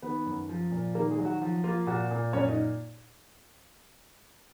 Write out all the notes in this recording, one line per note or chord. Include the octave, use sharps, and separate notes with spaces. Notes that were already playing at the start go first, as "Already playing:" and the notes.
D#3 B3 B4
F#2
F3
A#2
D#3 A#3 A#4
G#3 G#4
F#3
F#4
F3 F#4
A#3 F4
A#2 F#4
A#2
F#2 C#4 C#5
D#4 D#5